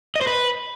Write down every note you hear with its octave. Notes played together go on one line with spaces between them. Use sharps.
D#5
C5
B4